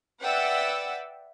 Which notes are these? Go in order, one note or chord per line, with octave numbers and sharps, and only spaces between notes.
B4 D5 E5 F#5 G5 E6